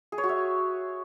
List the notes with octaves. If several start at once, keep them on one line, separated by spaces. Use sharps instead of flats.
G#4
C#5
F#4
E5